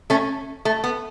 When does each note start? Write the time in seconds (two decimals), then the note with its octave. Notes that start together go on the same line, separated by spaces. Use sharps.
0.10 A3 C#4
0.65 A3
0.84 B3